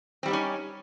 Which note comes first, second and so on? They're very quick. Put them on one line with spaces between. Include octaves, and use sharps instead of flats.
C4 G3 G4 D#4 C#4